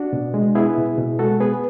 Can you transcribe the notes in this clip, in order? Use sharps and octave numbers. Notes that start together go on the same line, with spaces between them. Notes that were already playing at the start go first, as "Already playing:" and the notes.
Already playing: D4 F#4
B2
G#3
B3 E4 G#4
B2
B2
G#3 F#4 A4
B3 G#4 B4